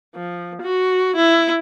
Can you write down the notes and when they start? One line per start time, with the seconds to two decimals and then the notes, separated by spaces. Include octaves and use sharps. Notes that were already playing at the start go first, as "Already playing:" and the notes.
0.15 F3
0.62 F#4
1.16 E4